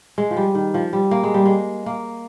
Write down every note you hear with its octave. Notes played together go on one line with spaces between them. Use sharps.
G#3
F3
G3
D#3
F3
G3
A#3
G#3
G3
G#3
A#3